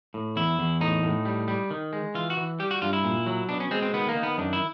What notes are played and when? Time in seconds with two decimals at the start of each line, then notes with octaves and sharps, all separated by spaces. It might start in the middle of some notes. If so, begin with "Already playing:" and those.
0.14 A2
0.36 E2 E4
0.59 E2
0.81 A2 D#4
1.03 A2
1.25 G3
1.48 G3
1.71 D#3
1.93 G#3
2.15 E3 F4
2.30 F#4
2.37 E3
2.59 G3 G4
2.71 F#4
2.82 G2 F4
2.93 E4
3.04 A#2
3.26 F#3
3.49 B2 D4
3.60 C#4
3.71 G#3 C4
3.82 C4
3.93 D#3 B3
4.09 A#3
4.16 D#3
4.23 B3
4.38 F#2 D4
4.53 E4